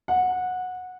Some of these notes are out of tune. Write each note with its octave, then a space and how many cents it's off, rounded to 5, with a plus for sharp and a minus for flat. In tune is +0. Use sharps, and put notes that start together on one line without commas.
F#5 -15